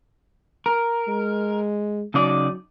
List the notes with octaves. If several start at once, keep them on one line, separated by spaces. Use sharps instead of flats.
A#4
G#3
C#3 F#3 D#4 D5